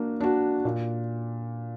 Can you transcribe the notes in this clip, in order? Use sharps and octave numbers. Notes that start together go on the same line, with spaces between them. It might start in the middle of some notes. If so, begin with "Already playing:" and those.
Already playing: A#3 D4 F#4
D4 F#4
A#2